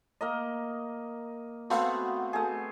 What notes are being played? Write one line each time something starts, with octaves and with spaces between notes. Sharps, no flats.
A#3 A#4 D#5
A3 B3 C4 F#4 F5 F#5
A3 G#4